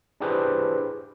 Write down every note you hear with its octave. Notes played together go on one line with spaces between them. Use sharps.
D4 E4 G4 G#4 B4 C5